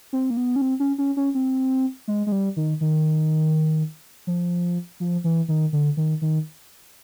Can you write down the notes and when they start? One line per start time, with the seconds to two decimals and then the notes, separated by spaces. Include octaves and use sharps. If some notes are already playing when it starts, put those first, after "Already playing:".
0.13 C4
0.30 A#3
0.37 B3
0.56 C#4
0.61 C4
0.80 C#4
0.98 C#4
1.17 C#4
1.35 C4
2.08 G#3
2.27 G#3
2.32 G3
2.56 D#3
2.81 D#3
4.27 F3
5.00 F3
5.24 E3
5.48 D#3
5.73 D3
5.97 D#3
6.22 D#3